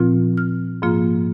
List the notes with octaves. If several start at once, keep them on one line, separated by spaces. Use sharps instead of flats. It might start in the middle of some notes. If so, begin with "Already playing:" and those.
Already playing: A#2 F3 C4 F4
F6
G#2 F3 A#3 F4